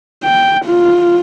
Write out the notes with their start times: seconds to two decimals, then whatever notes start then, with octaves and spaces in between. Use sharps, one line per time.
0.24 G5
0.65 F4